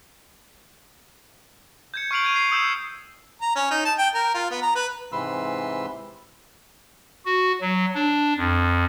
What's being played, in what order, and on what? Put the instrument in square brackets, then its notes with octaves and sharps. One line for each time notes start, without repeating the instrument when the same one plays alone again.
[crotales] G6 G#6 C#7
C#6 F6 C7 D7 F7 F#7
G6 G#6 D#7 F7
C7 D#7
D#6 E6 G6 E7
[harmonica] A#5
C#4
D#4
A5
G5
A#4
F4
B3
A#5
B4
[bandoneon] G#2 C3 E3 B4 C6 E6
[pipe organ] F#4
F#3
D4
F2